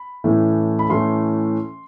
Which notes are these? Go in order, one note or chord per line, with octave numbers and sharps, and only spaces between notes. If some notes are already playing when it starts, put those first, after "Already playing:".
Already playing: B5
A2 E3 A3 C#4
B5
A2 E3 A3 C#4 C6